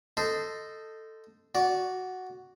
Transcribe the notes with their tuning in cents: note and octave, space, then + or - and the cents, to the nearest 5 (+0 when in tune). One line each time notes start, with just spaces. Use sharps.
A4 +10 C5 -15 D#5 +0
F#4 +0 D5 -20